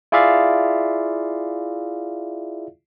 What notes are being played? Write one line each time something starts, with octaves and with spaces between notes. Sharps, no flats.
E4 F4 G#4 D5 E5 F5